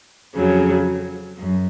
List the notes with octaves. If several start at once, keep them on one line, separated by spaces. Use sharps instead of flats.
F2 C#3 F#3
F#2